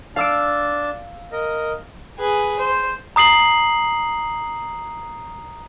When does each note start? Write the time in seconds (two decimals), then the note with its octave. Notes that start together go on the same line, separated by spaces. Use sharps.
0.16 D4 F5 A5 E6 D7
1.32 A#4 D#5
2.18 G#4 B4
2.59 C5
3.16 A#5 D#6 C7 F#7